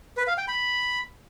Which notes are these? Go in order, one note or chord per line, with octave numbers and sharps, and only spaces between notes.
B4
F5
G5
B5